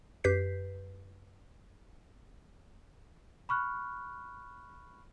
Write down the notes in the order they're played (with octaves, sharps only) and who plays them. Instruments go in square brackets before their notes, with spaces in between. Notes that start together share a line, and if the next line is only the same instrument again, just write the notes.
[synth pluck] F#2 G4 B4 G6 B6 C7
[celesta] B5 C#6 F6 F#6